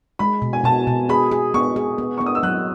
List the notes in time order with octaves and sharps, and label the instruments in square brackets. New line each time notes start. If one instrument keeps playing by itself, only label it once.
[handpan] G#3 [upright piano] B5
[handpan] B2
[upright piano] G#5
[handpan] B2 [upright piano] A5
[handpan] B2
[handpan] G#4 [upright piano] B5
[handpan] G#4
[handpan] B3 [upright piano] C#6
[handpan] G#4
B3
[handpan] B3 [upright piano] C#6
[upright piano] D#6
E6
[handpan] F#3 [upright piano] F#6